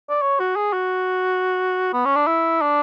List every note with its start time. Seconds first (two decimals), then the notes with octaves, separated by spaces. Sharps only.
0.10 D5
0.22 C#5
0.40 F#4
0.56 G#4
0.73 F#4
1.93 B3
2.05 C#4
2.16 D4
2.27 E4
2.62 D4